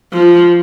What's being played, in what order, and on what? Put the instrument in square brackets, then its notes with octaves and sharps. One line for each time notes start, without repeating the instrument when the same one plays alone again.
[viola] F3